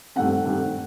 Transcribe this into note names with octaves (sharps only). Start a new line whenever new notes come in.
G2 D#3 A3 C4 F#5
G2 D#3 A3 C4